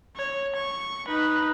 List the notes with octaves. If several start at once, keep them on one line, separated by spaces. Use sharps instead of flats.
C#5
C#6
D#4 B4